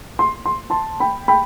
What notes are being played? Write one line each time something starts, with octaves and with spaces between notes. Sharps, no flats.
C6
C6
A5 C6
G5 B5
G5 B5